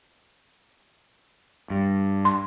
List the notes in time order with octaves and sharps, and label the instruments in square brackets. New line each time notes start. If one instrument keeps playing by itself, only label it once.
[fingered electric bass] G2
[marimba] C6